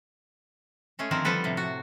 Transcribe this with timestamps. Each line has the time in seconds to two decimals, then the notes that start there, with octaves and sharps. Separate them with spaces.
0.99 G#3 A3 C#4 G#4
1.11 D3 D#3 F3 C4 A#4
1.25 F3 G3 B3 A4 B4
1.44 A2 C3
1.57 F#4